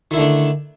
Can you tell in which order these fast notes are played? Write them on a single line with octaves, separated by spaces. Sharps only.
D#3 E4 D3 A3 D4